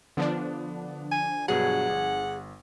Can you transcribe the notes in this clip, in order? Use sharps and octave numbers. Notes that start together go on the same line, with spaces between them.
D3 F3 B3 D4
G#5
G2 B2 F#3 G#4 F#5
G1